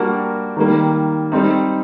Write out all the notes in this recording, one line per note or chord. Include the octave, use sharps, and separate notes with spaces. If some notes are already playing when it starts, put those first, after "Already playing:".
Already playing: G3 A#3 D4 F#4 A#4
D#3 G3 A#3
G3 C4 D#4